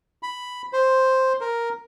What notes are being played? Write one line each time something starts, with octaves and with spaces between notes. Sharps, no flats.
B5
C5
A#4